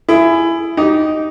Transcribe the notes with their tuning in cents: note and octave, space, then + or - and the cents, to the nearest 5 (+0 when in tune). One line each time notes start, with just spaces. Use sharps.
E4 +20 G#4 +0
D#4 +0 G4 -20 D#5 +10